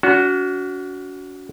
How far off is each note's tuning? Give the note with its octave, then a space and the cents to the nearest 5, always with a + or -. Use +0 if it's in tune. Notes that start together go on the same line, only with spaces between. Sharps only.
C#4 +45 F#4 +0